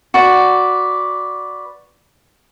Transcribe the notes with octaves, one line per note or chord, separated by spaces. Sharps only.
F#4 B4 D5